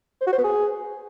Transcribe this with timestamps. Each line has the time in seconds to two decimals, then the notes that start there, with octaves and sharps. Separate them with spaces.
0.21 C5
0.27 F#4
0.32 C5
0.38 B3
0.44 G#4